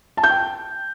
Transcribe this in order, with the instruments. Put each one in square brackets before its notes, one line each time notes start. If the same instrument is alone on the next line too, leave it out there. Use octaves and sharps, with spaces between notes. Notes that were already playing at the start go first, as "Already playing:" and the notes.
[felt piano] A5
G6
G5